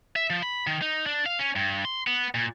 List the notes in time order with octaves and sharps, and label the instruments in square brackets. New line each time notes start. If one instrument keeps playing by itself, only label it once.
[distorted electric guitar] E5
F3
B5
D#3
D#4
D4
F5
C#4
G2
C6
B3
A#2